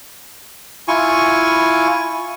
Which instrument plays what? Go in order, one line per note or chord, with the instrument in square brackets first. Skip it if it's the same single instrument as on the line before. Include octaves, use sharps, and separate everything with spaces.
[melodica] E4 F4 G#5 C#6